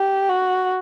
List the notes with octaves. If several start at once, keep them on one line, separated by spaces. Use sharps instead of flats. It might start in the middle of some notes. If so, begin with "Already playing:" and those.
Already playing: G4
F#4